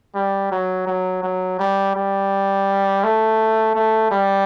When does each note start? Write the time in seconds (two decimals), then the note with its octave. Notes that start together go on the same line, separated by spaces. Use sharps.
0.15 G3
0.51 F#3
0.87 F#3
1.23 F#3
1.59 G3
1.95 G3
3.04 A3
3.75 A3
4.11 G3